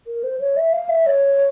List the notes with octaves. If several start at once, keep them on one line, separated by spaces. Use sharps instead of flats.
A#4
C5
C#5
E5
F5
E5
C#5